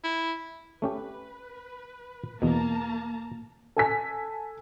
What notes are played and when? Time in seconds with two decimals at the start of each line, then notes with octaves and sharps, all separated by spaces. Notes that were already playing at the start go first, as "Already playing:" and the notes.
0.04 E4
0.82 A3 C#4 G4 B4
2.42 E2 B2 A#3 A5 A#5
3.76 A4 G#5 B6